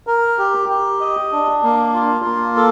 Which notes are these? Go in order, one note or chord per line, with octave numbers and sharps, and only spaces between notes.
A#4
G4
G4
D#5
D4
A#3
F4
A#3
A4